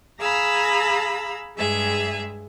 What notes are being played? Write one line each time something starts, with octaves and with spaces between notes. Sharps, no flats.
G#4 F5 A#5 B5 E6
G2 G#3 G#4 E5